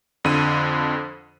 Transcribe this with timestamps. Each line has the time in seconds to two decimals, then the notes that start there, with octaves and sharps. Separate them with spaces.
0.24 F2 D3 D#7